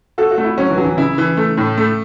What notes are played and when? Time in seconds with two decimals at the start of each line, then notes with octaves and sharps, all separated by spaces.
0.18 F#4 A4
0.31 F#4
0.38 A3
0.45 E4
0.58 F#3 C#4
0.70 E3
0.77 F#3
0.84 E3
0.97 C#3 E4
1.18 E3
1.37 A3
1.57 A2
1.78 A3